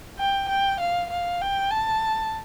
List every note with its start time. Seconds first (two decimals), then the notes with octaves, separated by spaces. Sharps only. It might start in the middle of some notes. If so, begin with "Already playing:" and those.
0.18 G5
0.48 G5
0.80 F5
1.10 F5
1.41 G5
1.71 A5